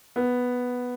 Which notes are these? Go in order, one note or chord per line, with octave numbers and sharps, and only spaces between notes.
B3